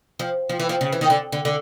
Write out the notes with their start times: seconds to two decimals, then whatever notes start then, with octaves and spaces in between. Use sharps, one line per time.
0.19 F3
0.49 F3
0.60 E3
0.69 F3
0.81 C#3
0.92 E3
1.01 D#3
1.10 D3
1.32 D3
1.45 D3